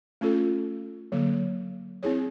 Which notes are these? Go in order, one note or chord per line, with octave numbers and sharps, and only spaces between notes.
A3 C#4 F4 A4
D3 F#3 A#3
C4 E4 G#4 C#5